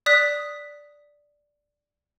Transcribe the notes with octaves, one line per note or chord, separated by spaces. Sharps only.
D5 D#6 F#6 B6